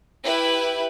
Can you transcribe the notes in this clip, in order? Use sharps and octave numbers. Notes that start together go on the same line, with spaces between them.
E4 G4 B4